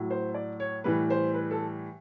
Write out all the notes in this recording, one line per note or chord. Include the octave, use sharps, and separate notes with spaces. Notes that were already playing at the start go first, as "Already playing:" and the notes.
Already playing: A2 F#3
C5
D5
C#5
A2 E3 G3 B4
C5
B4
A4